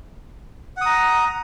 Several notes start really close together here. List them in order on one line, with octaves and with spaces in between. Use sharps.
F#5 D#6 A#5